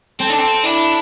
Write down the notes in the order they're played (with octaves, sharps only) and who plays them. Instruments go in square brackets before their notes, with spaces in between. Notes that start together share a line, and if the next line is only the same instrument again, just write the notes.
[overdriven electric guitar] C4 [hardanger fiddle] A4
[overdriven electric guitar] D4
C4
[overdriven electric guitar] D4 [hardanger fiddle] E4